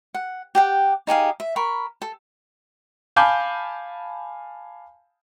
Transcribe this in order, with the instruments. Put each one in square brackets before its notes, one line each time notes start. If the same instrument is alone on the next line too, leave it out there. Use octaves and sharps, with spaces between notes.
[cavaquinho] F#5
G4 F#5 G5
D#4 G4 G#4 F5
E5
A#4 B5 C#6
A4
[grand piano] F5 G#5 A5 B5 D6 G6